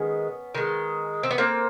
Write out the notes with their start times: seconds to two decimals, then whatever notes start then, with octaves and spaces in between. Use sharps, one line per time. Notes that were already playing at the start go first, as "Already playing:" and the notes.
Already playing: D#3 G#3 B3 C#4
0.55 D#3 G#3
1.23 C4
1.31 B3
1.38 A#3 C4